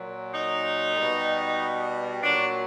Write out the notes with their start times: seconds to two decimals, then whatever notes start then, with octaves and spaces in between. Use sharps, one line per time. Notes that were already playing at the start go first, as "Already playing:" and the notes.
Already playing: A#2 F#3
0.33 D#4
0.96 B2 G3
2.23 A#2 F#3 D4